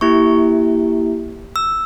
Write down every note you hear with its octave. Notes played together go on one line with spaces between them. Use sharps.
A#3 E4 G4 C#6
E6